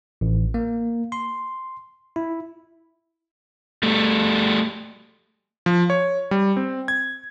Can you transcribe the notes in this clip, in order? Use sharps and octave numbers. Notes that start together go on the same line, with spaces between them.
A1
A#3
C6
E4
G3 A3
F3
C#5
G3
C4
G#6